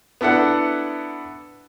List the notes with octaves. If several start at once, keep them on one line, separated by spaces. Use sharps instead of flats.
B3 D4 E4 A4 F#5